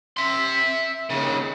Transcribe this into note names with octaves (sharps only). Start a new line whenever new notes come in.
E5 C6
D#2 C#3